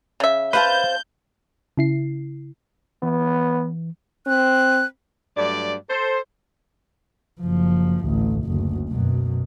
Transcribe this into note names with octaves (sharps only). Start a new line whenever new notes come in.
C#3 E5
B4 C5 F5 A5 G6
C#3 E4 C7
E3 B3
C4 F#6
G2 F#3 A3 D5
A4 C5
F#1 F3
A1 D2
F#1 D2
F#2 B2